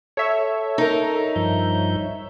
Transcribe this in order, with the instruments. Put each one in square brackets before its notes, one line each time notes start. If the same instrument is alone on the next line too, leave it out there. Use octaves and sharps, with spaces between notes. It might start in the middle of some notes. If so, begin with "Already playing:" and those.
[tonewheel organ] A4 [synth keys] C#5 E5
[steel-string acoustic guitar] D#4 A#4
[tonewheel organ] G2 F3 G6